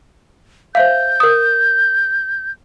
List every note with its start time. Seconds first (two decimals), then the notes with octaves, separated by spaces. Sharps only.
0.75 C5 E5 F5 G6
1.20 A#4 D#6